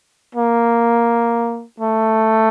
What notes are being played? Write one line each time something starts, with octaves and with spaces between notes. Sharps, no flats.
A#3
A3